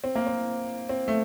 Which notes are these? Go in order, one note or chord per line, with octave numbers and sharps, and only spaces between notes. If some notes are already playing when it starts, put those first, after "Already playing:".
C4
A#3
C4
C4
A3